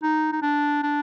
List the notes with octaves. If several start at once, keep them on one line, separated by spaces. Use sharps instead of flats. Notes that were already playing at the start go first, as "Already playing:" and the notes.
D#4
D#4
D4
D4